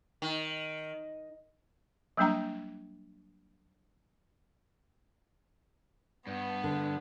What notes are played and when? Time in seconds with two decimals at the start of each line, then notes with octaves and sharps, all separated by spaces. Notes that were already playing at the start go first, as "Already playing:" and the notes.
0.22 D#3
2.17 F#3 G3 A#3 D4 G5 A#5
6.27 G2 B3
6.64 D3